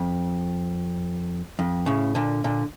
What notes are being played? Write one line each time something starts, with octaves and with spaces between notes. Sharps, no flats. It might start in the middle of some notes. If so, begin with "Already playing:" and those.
Already playing: F2
F2
A2 C#3
A#2 D3
A#2 D3